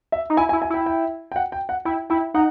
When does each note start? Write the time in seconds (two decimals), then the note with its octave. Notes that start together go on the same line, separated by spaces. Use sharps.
0.12 E5
0.30 D#4
0.37 E4 G#5
0.49 G#5
0.53 E4
0.62 G#5
0.70 E4 G5
0.86 G5
1.32 G5
1.36 F#5
1.52 G5
1.69 F#5
1.85 E4 G5
2.10 E4 G5
2.34 D#4 F#5